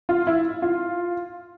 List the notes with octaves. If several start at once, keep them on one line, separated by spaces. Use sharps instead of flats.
F4
E4
F4